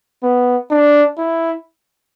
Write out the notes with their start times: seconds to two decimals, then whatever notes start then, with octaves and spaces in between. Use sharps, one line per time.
0.23 B3
0.70 D4
1.18 E4